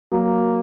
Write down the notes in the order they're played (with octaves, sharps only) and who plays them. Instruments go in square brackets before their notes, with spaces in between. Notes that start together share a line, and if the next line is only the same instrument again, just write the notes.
[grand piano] F#3 [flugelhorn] A#3